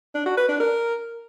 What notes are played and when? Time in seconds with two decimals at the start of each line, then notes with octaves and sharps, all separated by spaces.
0.15 D4
0.26 F#4
0.37 B4
0.49 D4
0.60 A#4